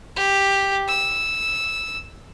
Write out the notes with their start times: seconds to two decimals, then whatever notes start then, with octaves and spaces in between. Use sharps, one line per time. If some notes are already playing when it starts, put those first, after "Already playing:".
0.16 G4
0.88 E6